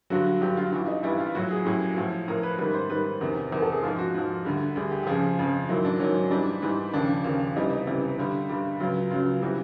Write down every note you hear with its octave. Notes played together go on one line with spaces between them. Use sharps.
G2 D3 F#3 F#4
G2 D3 F#3 G4
F4
G2 E3 G3
D#4
G2 E3 G3 E4
F4
A2 F#3 F#4
G#4
A2 F#3 G4
A2 F3
A2 F3 A#4
B4
G#2 D#3 G3 B4
C5
G#2 D#3 G3 B4
E2 C3 D#3 A#4
E2 C3 D#3 A#4
A4
G#4
G#2 F3 F4
F#4
G#2 F3
D2 D3 G3
D2 D3 G3 G#4
G4
G4
F2 C#3 F3 G#4
F2 C#3 F3
G#2 D#3 F#3 E4
D4
G#2 D#3 F#3 C#4
G#2 E3 G3 D4
G#2 E3 G3
D#2 C#3 F3 D4
D#2 C#3 F3
C#2 C3 E3 G3 D#4
D#4
C#2 C3 E3 G3
G2 D3 G3
G2 D3 G3
C#2 C#3 F#3 F4
C#2 C#3 F#3 F4
C3 E3 G3 F#4